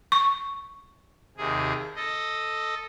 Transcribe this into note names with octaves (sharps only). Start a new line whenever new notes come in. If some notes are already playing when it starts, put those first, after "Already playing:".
C#6
D#2 C3 G#4
A4 D#5